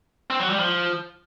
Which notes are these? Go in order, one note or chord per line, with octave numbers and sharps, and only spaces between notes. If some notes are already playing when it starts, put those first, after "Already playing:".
C4
F#3
G3
F3